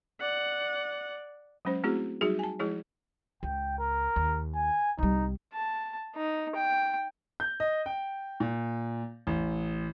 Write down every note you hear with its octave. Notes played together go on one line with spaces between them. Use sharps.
D5 F#5
F#3 G#3 C#4 C5
A3 C4 E4 F#4 G#4
F#3 G3 D#4 F#4 G#4
G#5 A5
F3 G#3 E4 G#4 C#5
C#2 G5
A#4
D#2
G#5
C2 G3 D#4
A5
D#4
G5
G6
D#5
G5
A#2
A1